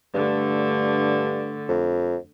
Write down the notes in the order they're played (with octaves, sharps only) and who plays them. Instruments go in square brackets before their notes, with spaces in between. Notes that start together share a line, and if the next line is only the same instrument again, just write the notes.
[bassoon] G2 [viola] D3 A3
[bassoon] F2